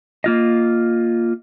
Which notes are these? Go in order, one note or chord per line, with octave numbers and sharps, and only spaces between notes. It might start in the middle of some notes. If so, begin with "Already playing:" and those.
A#3 F4 D#5